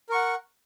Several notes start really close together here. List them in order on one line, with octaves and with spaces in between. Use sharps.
A#4 C#6 F#5